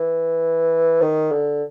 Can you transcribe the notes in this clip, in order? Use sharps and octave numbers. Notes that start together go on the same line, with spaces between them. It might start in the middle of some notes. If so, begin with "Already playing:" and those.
Already playing: E3
D#3
D3